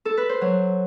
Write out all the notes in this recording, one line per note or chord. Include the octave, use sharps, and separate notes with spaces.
A4
B4
C5
F#3